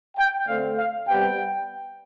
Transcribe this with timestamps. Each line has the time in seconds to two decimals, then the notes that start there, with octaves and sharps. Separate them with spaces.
0.17 G5
0.47 D3 A3 C4 F5
0.77 F5
1.07 C3 G3 B3 G5